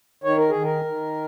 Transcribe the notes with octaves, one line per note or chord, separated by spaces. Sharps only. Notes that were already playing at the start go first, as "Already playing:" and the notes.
D#3 C#5
A#4
D#3 G#4
A#4
D#3